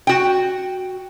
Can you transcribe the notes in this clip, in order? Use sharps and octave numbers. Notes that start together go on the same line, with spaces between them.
F#4 G5